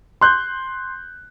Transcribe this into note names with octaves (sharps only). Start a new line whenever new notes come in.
C6 F#6 G6